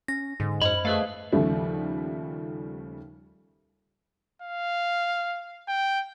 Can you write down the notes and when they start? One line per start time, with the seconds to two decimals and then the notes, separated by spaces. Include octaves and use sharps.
0.08 C#4 A#6
0.40 G#2 D3
0.62 F#2 C5 D#5 B5
0.85 A3 G#4 B4 F5
1.32 D#2 C#3 F3 G3 A3
4.42 F5
5.68 G5